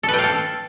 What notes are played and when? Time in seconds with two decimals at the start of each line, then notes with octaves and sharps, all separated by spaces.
0.03 A4
0.08 B4
0.13 G5
0.18 F5
0.23 A4